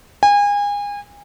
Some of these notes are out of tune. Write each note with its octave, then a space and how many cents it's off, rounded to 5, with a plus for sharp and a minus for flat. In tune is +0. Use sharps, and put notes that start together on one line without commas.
G#5 -30